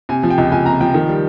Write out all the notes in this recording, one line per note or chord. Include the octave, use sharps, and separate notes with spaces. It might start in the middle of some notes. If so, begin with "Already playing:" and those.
C3 G#5
F3
G5
C#2
C#2 G#5
C3 A#5
F3 G5
D#3
G3